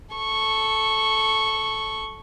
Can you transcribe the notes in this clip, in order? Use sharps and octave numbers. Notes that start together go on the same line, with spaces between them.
A4 C#6